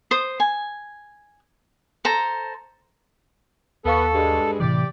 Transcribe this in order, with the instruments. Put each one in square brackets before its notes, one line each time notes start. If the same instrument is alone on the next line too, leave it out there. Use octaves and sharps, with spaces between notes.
[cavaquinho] C5 D#6
G#5
A4 C5 A#5
[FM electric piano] D#2 F5 C#6 [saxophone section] B3 [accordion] A4
[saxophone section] G2 G#3
[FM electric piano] A2 C3 E3 [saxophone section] G4 D5